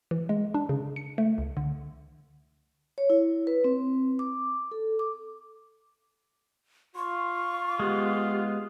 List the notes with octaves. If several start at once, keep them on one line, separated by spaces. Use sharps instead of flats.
E3
G#3
D4
C#3
C#7
A3
C#2
D3
C#5
E4
B4
C4
D6
A4
D6
F4 C6 C#6
G#3 B3 G4